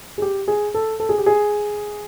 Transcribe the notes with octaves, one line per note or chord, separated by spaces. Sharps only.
G#4
G4
G#4
A4
A4
G#4
G4
G#4